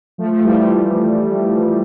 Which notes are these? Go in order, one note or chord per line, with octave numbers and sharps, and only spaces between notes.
F3 A3
F3 A3
E3 G3
F3 A3